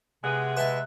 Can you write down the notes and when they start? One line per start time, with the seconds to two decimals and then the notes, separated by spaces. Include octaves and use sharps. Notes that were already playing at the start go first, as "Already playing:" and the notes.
0.24 C3 G#3 B3 G#4 F#5
0.57 G#3 B4 E5 A5